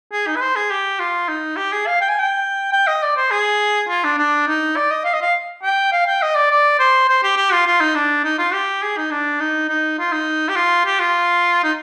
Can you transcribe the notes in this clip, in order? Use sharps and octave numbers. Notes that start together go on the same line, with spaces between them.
G#4
D#4
B4
C5
G#4
G4
F4
D#4
G4
G#4
F5
G5
G#5
G5
G5
D#5
D5
C5
G#4
F4
D4
D4
D#4
D5
D#5
F5
D#5
F5
G5
F5
G5
D#5
D5
D5
C5
C5
G4
G4
F4
F4
D#4
D4
D#4
F4
G4
G#4
D#4
D4
D#4
D#4
F4
D#4
G4
F4
G4
F4
D#4